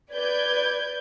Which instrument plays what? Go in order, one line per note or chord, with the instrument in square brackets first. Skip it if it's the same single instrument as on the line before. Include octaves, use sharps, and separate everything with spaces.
[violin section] B4 D5 G6 G#6